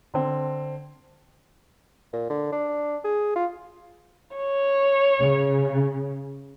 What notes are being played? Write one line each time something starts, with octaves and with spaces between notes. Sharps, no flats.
D3 C4
A#2
D3
D4
G#4
F4
C#5
C#3